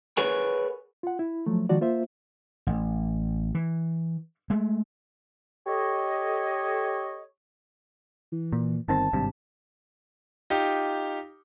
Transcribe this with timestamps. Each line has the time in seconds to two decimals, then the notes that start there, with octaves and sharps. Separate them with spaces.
0.17 G#4 A#4 B4 C#5 F#5 G#5
1.03 F4 F#5
1.19 E4
1.46 F3 F#3 A3
1.69 D#3 F3 G#3 F#4 D5
1.81 A#3 F4 C5 E5
2.67 A1
3.55 E3
4.50 G#3 A3
5.67 G4 A4 C#5 D#5
8.32 E3
8.53 A#2
8.88 G1 D#3 C4 A5
9.13 G#1 G2 C3
10.50 D#4 F4 G4